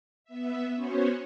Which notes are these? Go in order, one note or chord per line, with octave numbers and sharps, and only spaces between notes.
B3 E5
B3 C#4 F#4 C5 C#5